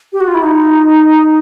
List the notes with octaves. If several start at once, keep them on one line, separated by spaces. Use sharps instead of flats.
G4
F#4
F4
E4
D#4